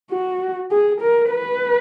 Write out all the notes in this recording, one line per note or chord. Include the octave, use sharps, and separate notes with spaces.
F#4
G#4
A#4
B4